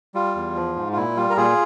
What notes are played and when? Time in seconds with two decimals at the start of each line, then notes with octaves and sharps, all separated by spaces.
0.15 G3 F4
0.35 E2
0.56 F3
0.76 G#2
0.93 F4
0.97 A#2 E4
1.16 G3 F4
1.30 A#4
1.37 A#2 F4 G#4